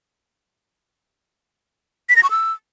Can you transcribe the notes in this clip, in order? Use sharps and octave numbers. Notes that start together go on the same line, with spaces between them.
B6
A#6
C#6
E6